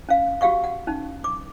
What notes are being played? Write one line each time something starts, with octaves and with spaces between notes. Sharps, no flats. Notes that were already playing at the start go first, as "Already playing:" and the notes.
C#4 F5
F#4 G4 F5 F#5 C#6
F#5
C#4 D#4
D6